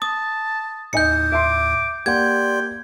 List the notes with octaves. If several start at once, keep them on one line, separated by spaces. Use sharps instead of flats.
A5 D#6
D#2 A2 D#4 D#5 G#5 G6 C#7
E5 C6 D6
A#3 G4 D5 F#5 G5 C6 G#6